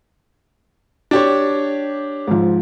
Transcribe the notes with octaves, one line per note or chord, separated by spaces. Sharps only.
D4 G4 C#5
G#2 F3